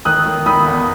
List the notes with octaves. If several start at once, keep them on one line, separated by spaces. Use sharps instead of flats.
D#3 D#6 F#6
D#3
D#3 B5 D#6
E2